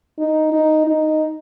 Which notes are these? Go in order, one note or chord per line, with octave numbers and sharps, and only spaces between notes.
D#4
D#4
D#4